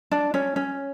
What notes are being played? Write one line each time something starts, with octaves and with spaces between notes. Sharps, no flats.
D4
C#4
C#4